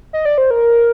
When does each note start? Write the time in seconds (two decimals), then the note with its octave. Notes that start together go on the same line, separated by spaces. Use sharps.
0.13 D#5
0.25 D5
0.38 C5
0.51 A#4